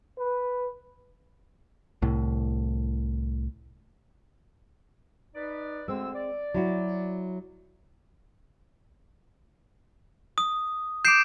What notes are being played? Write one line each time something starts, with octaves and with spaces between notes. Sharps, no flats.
B4
C2 A2
D#4 B4 D5
D2 D3 G#3 C4 E6
D5
F#3 E4 F#4
D#6
D6 G6 C7 D7 E7